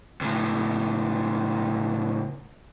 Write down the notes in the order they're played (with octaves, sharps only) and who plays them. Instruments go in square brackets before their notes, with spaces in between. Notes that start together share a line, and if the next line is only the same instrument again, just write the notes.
[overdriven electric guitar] C#2 A2